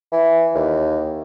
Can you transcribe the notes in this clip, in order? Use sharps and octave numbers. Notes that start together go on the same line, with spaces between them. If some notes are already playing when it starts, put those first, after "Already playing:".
E3
D#2